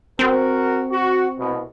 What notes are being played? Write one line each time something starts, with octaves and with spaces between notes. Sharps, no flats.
C4 F#4 A#4
F#4
C2 B2